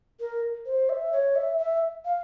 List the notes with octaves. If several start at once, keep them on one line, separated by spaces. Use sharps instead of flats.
A#4
C5
E5
C#5
E5
E5
F5